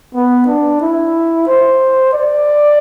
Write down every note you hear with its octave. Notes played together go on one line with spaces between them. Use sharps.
B3
D4
E4
C5
D5